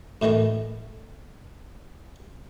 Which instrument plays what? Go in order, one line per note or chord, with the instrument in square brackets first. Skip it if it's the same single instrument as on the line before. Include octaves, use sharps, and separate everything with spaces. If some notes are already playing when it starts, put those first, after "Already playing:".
[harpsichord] F#2 A2 D#3 E3 A3